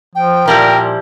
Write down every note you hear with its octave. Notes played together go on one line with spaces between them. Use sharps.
F3 G5
A#2 F3 G3 E4 A#4